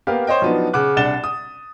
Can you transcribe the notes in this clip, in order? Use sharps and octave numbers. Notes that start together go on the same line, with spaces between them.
A#3 B3 G4 A#4 F5
C5 C#5 D#5 G5
F3 F#3 B3 D4 D#4
C#3 F#5 D6 F#6
C2 D4 F#5 A6 E7 G7
D#6